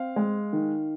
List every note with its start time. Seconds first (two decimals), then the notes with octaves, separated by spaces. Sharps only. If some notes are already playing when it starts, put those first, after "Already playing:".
Already playing: C4 F5
0.16 G#3
0.53 D#3